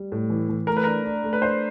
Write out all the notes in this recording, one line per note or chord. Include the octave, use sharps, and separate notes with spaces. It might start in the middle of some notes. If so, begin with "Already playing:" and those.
Already playing: G3
A2
E3
E3
A3 A#4
B4
D4 A#4
D4
A3
B4
D4 C5